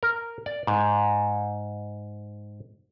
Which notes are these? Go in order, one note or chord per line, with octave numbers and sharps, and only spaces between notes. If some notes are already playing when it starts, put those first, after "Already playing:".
A#4
D5
G#2